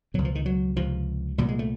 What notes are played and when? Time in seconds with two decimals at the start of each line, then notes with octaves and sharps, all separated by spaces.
0.14 C#2 B2 F#3
0.25 F3
0.35 D#3
0.46 F#3
0.77 C#2 C3 F3
1.38 C2 A#2 G3
1.49 G#3
1.59 A3